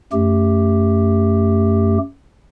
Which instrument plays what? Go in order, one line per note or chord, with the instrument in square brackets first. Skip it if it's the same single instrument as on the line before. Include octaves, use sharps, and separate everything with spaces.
[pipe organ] F#2 A3 G4